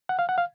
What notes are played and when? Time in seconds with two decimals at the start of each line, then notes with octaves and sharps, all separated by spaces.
0.09 F#5
0.19 F5
0.29 F#5
0.38 F5